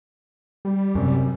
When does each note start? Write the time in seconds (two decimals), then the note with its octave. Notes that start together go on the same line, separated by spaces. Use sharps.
0.65 G3
0.95 F#2 C3